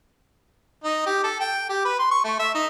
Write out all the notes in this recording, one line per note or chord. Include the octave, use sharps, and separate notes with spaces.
D#4
G4
A4
G5
G4
B4
C6
C#6
A3
E5
D#4